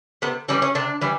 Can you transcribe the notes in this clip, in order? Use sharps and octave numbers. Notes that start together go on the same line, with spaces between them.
C3 B3
E3 G3 C#4
C#4
C3 D4
E3 G3